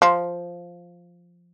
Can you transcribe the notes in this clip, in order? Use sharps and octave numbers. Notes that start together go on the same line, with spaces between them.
F3